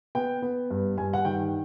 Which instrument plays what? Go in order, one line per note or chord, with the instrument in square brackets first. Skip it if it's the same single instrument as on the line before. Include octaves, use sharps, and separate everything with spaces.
[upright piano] B3 G5
B3
G2
G2 G#5
F#5
D#3 G5